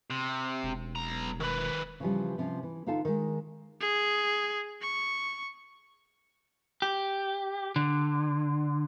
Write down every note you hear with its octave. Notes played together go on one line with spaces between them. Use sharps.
C3
E1
B1 A#5
D#3 B4
C#3 E3 F3 G3
C3 F3 C#4
E3
D3 D#4 F4 A4 F5 A5
D#3 G#3
G#4
C#6
G4
D3